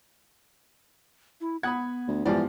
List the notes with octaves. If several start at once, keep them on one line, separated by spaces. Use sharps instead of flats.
E4
B3 F#5 B5 D#6 G#6
D2
G#2 E3 F3 G3 B3 D5